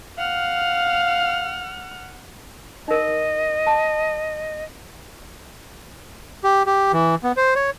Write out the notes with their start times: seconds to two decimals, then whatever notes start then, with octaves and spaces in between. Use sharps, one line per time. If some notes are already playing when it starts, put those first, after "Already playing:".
0.18 F5 F#5 F6
2.88 D#4 A#4 D#5
3.67 A5
6.44 G4
6.67 G4
6.93 E3
7.24 B3
7.37 C5
7.56 C#5